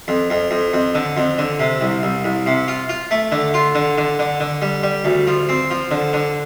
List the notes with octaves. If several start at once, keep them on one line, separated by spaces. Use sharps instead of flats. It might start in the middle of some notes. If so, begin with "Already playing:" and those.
F2
F2
F2
F2
D3
F2
D3
C3
C2
C2
C2
C3
F4
F4
A3
D3
F4
D3
D3
D3
D3
G3
G3
D2
F3
C4
F3
D3
D3